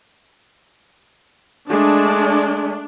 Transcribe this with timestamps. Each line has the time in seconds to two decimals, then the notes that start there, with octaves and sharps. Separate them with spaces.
1.70 G#3 A3 D4